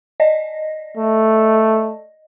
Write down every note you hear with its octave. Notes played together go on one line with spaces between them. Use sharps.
D5 D#5 A#6
A3